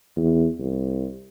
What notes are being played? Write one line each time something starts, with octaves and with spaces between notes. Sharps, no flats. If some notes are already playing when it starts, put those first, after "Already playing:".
E2
C2